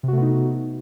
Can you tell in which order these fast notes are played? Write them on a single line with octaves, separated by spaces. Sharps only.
C3 F#4 A3 B3 D#4